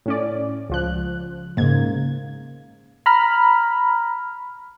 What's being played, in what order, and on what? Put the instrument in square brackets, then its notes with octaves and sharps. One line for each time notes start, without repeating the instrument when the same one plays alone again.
[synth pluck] A2 C#4 D5
C#2 F3 F#6
[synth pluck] G#2 G#6 [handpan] C#3 A#3
[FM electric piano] A#5 B5 F6